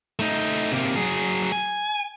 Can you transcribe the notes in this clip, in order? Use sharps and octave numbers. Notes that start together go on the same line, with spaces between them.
A3 D#4
C3 A#3
F#3 G#4
G#5